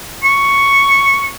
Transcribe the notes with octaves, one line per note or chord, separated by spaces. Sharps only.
C#6